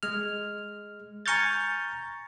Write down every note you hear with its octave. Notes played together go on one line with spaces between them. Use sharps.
G#3 F6
G#5 A#5 C#6 F6 G6 A6